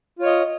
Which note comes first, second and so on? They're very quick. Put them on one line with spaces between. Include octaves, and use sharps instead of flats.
F4 C#5 D#5